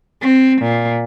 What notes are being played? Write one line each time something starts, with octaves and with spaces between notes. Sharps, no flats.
C4
A#2